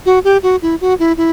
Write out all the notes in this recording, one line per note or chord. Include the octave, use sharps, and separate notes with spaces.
F#4
G4
F#4
E4
F#4
E4
E4